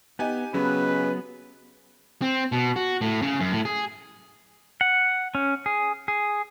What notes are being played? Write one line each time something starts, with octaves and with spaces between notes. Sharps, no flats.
B3 D#4 G4 G#5
C#3 F#3 B3 B4
C4
B2
F#4
A2
C#3
F#2
A2
G#4
F#5
C#4
G#4
G#4